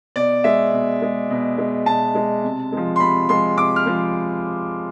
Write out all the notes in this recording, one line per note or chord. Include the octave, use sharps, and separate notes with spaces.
B2 D5
G#3 E5
B2
G#3
B2
G#3
B2 A5
G#3
C3
F3 G#3
C6
C3 B5
F3 G#3 C6
C3 D6
F6
F3 G#3